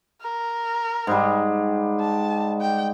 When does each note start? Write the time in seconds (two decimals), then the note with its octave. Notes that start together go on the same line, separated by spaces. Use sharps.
0.23 A#4
1.07 G#2 G3
2.00 A5
2.61 G5